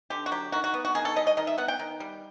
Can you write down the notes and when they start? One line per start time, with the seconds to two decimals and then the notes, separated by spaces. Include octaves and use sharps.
0.10 D3 G4
0.26 F#4
0.31 F#3 G4
0.52 D#3 F#4
0.64 F#4
0.74 B3
0.85 F#4
0.95 D#3 G#4
1.05 A4
1.16 G3 D#5
1.27 D#5
1.37 D#3 D#5
1.47 E5
1.58 B3 F#5
1.68 G5
1.79 D#3
2.00 G3